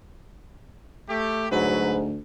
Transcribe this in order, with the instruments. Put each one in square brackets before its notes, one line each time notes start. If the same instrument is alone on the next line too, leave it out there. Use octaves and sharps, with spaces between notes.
[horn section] A3 G4
[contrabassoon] D2 [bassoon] G#2 [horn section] F#3 B4